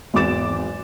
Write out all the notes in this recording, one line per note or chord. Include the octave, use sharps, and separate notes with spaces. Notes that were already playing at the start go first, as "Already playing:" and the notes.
G#1 E2 F#3 D6 A6 E7